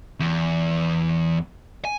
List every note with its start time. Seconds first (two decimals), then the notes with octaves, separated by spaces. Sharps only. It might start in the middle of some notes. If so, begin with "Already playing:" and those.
0.20 E2
1.85 G#5